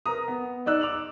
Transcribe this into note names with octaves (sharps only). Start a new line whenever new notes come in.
A#4 B4 A#5 D#6
B3
D#4 D5 E6 F#6
D6 E6 F7 F#7